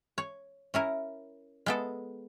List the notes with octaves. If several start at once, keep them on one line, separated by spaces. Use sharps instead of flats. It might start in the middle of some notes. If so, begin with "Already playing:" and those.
C#5
C#4 E4 A#4
G#3 B3 A4